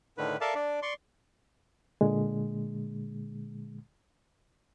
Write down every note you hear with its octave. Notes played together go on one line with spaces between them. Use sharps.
A2 D3 D#3 B4
A4 A#4 D5 E5 F5 A5
D4 D5
D5 C6 C#6
A#2 D3 G#3